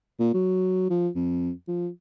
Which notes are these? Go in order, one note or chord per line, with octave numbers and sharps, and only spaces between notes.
A#2
F#3
F3
F2
F3